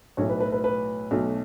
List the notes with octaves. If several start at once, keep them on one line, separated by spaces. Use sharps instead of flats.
B1 A2 A3 C#5
B4
B4
B4
B4
B1 B2 A3